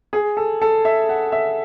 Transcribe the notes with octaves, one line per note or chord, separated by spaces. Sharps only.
G#4
A4
A4
E5
F#5
E5